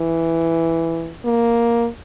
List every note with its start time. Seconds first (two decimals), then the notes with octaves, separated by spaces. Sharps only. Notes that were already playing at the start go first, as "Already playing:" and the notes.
Already playing: E3
1.25 A#3